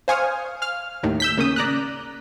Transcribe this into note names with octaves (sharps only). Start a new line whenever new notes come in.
C5 F5 G#5 C#6 D#6 F6
F5 F6
D#2 A2 D#3
E6 G6 B6
C#3 A#3 C#4 D#6
D5 A#5 F#6